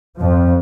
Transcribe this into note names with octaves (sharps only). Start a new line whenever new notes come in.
F2 F3